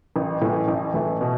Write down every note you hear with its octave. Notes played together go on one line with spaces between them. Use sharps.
A1
A2 E3 A3
A1
A2 E3 A3
B2